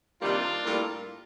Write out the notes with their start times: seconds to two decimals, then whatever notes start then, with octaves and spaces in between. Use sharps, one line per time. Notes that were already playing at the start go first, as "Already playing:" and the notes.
0.21 C3 D#3 G3 A#3 D4 F4
0.64 A2 G3 A#3